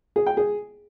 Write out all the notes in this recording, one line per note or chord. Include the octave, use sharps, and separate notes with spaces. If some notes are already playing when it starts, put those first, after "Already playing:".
G#4
G5
G#4